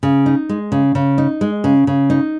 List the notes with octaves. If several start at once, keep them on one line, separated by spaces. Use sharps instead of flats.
C#3
D#4
G#3
C#3
C#3
D#4
G#3
C#3
C#3
D#4